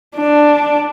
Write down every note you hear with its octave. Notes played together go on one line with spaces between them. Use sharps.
D4